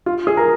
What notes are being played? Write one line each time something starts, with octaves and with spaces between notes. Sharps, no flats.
F4
G#4
A#4